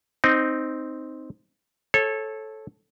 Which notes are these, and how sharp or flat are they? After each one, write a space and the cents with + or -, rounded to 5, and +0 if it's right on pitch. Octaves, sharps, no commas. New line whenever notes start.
C4 +0 D#4 +0
A4 -10 C#5 -25